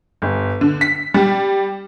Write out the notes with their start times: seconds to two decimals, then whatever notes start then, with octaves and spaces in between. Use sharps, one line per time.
0.22 G1
0.61 D3
0.81 B6
1.14 G3